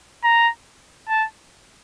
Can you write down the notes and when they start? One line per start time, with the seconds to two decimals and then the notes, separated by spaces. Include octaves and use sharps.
0.24 A#5
1.09 A5